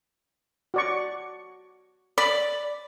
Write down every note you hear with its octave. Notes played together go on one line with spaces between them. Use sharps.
F#4 D5 C#6
D5 B5